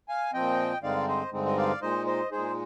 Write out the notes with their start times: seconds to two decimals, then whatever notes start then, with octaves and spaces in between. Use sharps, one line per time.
0.08 F5 G#5
0.33 A#2 F3 C4 D#5 G5
0.83 G2 D3 G#3 C4 D#4 D5 F5
1.08 C5 D#5
1.32 G2 D3 G#3 C4 D#4
1.46 D#5
1.57 D5 F5
1.82 A#2 G#3 D#4 C5 D#5
2.06 C5 D#5
2.31 A#2 G#3 D#4 G#4 C5